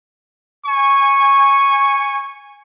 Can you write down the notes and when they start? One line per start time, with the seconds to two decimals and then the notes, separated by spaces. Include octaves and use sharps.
0.66 G#5 C#6